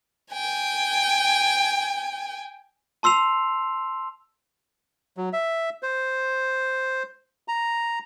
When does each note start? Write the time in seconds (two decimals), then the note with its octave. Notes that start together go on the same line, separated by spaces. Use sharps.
0.32 G5 G#5
3.03 A5 C6 E6 C7 F7
5.17 F#3
5.33 E5
5.83 C5
7.48 A#5